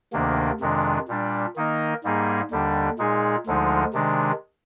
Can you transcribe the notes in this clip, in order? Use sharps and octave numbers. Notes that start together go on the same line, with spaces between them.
D2 C3 D#3 A#3 D4
F2 C3 D#3 G#3 D4
A#2 G3 D4
D#3 A#3 D#4 A#4 D#5
G#2 G3 A#3 D#4 G#4
D#2 D3 G3 D4
A#2 G#3 D#4 G#4
D2 D3 F3 G#3 D#4
C3 D#3 G#3 D4